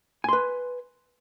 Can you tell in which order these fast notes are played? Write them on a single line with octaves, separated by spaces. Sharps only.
G#5 C6 B4